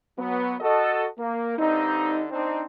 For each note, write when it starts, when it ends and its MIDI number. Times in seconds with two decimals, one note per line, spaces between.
0.18 0.54 54
0.18 0.54 59
0.61 1.05 66
0.61 1.05 69
0.61 1.05 75
1.18 1.55 58
1.57 2.23 43
1.57 2.23 50
1.57 2.23 55
1.57 2.23 60
1.57 2.23 63
2.30 2.61 60
2.30 2.61 62
2.30 2.61 63